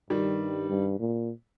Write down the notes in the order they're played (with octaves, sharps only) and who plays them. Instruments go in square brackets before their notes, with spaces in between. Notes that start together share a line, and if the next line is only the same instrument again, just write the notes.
[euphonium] G2 [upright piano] D#3 G3
[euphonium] G2
A#2